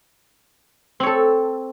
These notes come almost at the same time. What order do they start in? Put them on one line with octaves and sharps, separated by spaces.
C4 C#5 A4